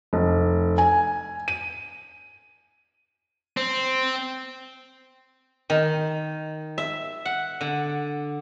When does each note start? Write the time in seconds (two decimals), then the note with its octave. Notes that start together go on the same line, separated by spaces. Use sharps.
0.13 F1
0.78 G#5
1.48 D#7
3.57 C4
5.70 D#3
6.78 E5
7.25 F#5
7.61 D3